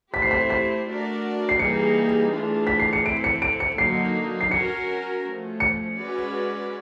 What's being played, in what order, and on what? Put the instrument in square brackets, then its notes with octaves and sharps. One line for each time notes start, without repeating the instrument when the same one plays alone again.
[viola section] A3 C4 E4 G4 C5 [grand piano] B6
[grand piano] C7
B6
B6
[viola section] A3 D4 F#4 A#4 D5
[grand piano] C7
[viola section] E3 G3 A#3 D#4 G#4 [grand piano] C#7
[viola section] E3 A3 D4 F4 G#4
[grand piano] B6
C7
C#7
[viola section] C4 E4 A4 [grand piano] D7
[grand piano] C#7
D7
C#7
[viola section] D3 F#3 A#3 D#4 [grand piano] C7
[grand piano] C7
[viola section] C#4 F#4 A#4 [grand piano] C#7
[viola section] F3 A3 C#4
[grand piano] C#7
[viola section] G#3 C#4 F#4 B4 D5